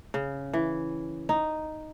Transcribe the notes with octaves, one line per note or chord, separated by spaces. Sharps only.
C#3
E3
D#4